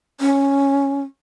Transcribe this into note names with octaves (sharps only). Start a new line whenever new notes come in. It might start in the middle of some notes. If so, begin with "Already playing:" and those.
C#4